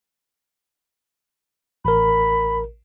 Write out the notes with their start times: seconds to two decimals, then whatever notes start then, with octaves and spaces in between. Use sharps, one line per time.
1.85 A1 A#4 B5